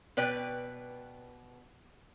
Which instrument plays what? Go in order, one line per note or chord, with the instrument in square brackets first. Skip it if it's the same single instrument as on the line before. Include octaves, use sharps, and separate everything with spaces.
[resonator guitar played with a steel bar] B2 B4 D5 G5